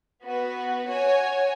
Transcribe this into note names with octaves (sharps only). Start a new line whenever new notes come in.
B3 F#4 B4
F#4 C#5 G#5